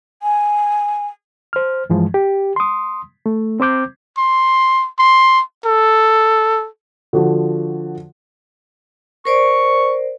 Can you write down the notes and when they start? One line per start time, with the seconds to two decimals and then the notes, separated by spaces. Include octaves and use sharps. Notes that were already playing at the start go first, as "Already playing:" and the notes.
0.23 G#5
1.53 C5 F6
1.90 G2 E3 F3 G#3
2.14 G4
2.56 C6 D#6
3.26 A3
3.60 C4 C5 D6 G6
4.18 C6
4.99 C6
5.65 A4
7.13 D3 F3 F#4
9.25 A#4 C5 D5 C#6